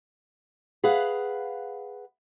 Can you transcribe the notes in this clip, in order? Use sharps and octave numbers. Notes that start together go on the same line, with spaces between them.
G#4 B4 F5 F#5